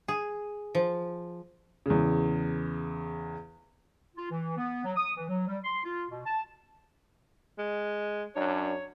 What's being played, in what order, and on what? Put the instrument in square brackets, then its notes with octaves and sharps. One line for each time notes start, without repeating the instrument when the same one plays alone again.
[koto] G#4
F3
[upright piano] E2 C#3
[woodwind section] F4
E3
B3
F#3
D#6
E3
F#3
G3
C6
F4
B2
A5
[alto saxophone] G#3
[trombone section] F#2 D4 [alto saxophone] C#5